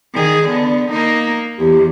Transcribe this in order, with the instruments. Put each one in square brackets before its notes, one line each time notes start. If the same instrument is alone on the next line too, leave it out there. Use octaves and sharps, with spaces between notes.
[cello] D#3 G#4
D3 B3
A#3 D#4
[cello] E2 [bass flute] G4